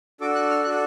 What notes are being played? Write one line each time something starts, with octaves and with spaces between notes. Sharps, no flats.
D4 F#4 A4 D6
F#6
F6
D4 F#4 A4 F#6